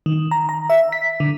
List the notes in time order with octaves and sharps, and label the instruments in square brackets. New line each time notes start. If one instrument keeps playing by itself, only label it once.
[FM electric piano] D#3
A#5
A#5
E5
B6
D3